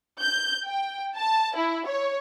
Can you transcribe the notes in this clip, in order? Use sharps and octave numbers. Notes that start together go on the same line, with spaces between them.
G6
G5
A5
E4
C#5